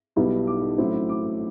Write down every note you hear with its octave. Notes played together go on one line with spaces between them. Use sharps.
B1 B2 G3 B3 E4
D6
A1 A2 F#3 C4 E4
D6